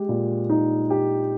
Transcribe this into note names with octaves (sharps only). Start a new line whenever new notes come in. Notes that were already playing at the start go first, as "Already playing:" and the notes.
Already playing: G#3 G4
A#2
D#4
G4